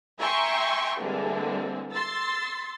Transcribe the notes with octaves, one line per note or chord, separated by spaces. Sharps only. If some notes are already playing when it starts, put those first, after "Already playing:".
E5 G5 G#5 A#5 C6 C#6
D3 E3 G3 G#3 A#3 C4
C6 E6 A6